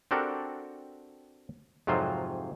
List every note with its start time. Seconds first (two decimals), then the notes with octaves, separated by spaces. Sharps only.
0.11 C4 D4 F#4 G4 A4 A#4
1.87 F2 G#2 C3 F#3 F4 C5